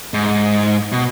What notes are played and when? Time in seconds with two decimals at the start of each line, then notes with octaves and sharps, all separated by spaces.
0.14 G#2
0.92 B2